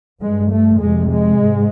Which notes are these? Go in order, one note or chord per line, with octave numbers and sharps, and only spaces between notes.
G2 G#3
A3
F2 C3 G#3
G#3
G#2